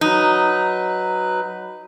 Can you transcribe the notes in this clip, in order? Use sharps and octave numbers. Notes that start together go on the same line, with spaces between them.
F#3 D#4 B4